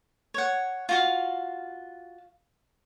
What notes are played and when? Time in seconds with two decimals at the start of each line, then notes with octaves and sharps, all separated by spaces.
0.34 C#5 F#5
0.89 F4 F#4 F5